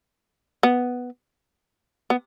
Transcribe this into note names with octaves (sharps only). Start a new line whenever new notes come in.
B3
B3